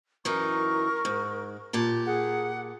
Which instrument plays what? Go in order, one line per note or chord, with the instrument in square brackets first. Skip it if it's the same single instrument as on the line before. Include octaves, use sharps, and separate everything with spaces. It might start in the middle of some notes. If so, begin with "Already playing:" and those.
[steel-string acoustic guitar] F#2 E3 D#4 [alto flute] A#4 [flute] C#6
[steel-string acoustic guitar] G#2
A#2 G4 A5
[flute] G#4 [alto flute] F#5